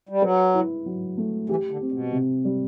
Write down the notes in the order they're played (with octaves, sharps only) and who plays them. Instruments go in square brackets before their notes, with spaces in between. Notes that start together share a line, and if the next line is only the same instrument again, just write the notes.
[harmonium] G3
[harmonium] F#3 [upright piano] B4
[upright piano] E4
F#3
A3
[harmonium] E3 [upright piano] G4
[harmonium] D3
[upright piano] C4
[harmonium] B2
[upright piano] C3
G3